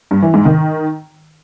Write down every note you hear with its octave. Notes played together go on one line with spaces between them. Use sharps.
G2
E3
G#2
D#3